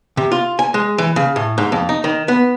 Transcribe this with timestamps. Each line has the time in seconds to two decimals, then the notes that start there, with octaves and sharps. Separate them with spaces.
0.17 C3
0.32 F4
0.59 G#5
0.74 G#3
0.98 E3
1.16 C#3
1.36 A2
1.58 G#2
1.72 F2
1.89 D#4
2.04 D#3
2.28 B3